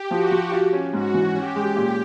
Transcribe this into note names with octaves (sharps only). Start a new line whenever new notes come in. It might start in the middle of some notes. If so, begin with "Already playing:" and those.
Already playing: G4
F3 F#4
F3
F4
C#4
G#2 F#4
E3
C#4 G4
G#3
A#2